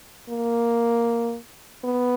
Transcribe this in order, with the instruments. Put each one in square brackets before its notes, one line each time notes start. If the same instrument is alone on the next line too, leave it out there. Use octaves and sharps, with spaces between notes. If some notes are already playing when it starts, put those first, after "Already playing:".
[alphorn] A#3
B3